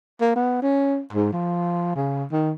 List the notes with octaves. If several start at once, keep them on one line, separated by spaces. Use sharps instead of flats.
A#3
B3
C#4
G#2
F3
C#3
D#3